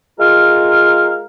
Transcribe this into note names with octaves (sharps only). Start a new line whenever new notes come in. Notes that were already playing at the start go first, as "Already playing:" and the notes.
G#3 F4 A#4 F5